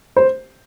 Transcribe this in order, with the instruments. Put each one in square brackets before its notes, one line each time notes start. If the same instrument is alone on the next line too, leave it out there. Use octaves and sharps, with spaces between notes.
[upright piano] C5